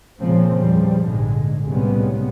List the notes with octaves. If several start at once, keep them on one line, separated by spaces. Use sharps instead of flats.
A#2 C#3 F3 G#3 A#3 C4
E2 F3 G3
A#1 G#2 D3 G#3
C2 A2 C#3 G3 G#3 B3